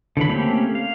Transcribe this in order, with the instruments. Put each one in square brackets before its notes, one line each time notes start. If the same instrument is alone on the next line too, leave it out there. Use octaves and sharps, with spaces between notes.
[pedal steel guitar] D3 E3 F#3 B5
A3 A#3 C4 C#4 G4
F5